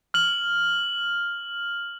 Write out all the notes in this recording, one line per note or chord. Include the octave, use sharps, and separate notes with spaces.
F6 F#7